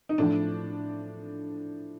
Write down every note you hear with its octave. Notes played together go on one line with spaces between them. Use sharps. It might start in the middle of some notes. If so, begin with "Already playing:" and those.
D#4
A2 F3 D4